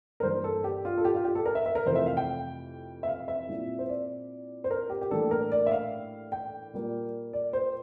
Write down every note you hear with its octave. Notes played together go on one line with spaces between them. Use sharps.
A#4
G2 E3 A#3 C5
A4
G4
F4
A4
G4
F4
G4
A4
A#4
E5
E5
A#4
F2 C3 E3 A3 C5
E5
F5
G5
E5
F5
E5
A#2 G3 C4 E4
C5
D5
C5
A#4
G4
G4
A2 E3 G3 A#3 D4 A4
A#4
D5
E5
F5
G5
A#2 G3 A#3
D5
C5